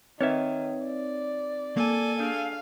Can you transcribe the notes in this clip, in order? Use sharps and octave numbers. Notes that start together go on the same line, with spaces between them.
D#3 C4 D#4 B4 C#5 E5
D5
A#3 A4 G#5
D4 G#4 F5